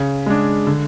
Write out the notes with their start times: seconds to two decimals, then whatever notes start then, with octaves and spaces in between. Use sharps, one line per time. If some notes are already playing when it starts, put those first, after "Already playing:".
Already playing: C#3
0.26 G#3 D4
0.67 D3